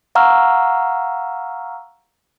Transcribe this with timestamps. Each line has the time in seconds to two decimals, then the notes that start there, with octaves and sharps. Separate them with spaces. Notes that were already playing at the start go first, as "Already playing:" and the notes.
0.15 F5 F#5 A#5 C#6 E6 F6